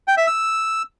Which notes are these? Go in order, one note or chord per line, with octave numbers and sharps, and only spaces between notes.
G5
E5
E6